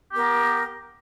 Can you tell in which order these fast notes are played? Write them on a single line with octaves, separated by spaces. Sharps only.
G4 B3 A#4